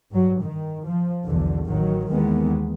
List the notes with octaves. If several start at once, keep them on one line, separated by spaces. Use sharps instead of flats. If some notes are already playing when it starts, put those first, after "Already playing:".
G2 F#3
D#3
F3
B1 E2 D3
A1 D#3 F#3
D#2 D#3 E3 G#3 B3